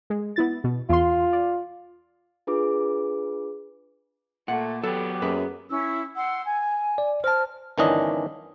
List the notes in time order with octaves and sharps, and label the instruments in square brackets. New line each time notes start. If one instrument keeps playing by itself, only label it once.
[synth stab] G#3
B3 E4 A6
B2
[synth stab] E2 C6 [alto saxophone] F4
[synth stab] D5
[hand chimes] D4 F4 G#4 B4 D6
[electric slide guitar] A#2 [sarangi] A3 [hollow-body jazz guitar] F#5
[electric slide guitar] F#3 G4 [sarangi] B3 [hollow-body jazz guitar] A4
[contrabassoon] F#2 [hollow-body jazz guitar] A#3 G#4 B4
[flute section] C#4 E4 E6
F#5 C6 E6
G#5
[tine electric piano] D5
[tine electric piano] C5 A5 [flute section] F6
[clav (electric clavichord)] G1 D#3 E3 C#4 D4 D#5